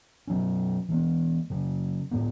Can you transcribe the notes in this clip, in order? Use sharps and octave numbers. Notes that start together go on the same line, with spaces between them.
B2 F#3 C#4
E3 G#3 B3
C#3 F#3 C#4
A2 G#3 B3